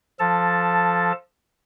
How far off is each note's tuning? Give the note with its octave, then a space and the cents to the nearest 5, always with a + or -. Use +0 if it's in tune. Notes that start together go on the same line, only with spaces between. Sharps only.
F3 +0 A4 +0 A5 +5